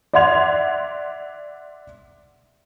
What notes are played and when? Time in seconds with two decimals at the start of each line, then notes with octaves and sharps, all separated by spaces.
0.13 D5 E5 F#5 C6 G#6 F7